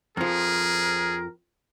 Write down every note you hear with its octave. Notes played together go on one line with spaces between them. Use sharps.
F2 F3 G#4 A#4